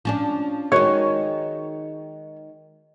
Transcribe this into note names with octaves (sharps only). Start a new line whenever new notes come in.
F3 C#4 D4
D#3 G#3 F#4 C#5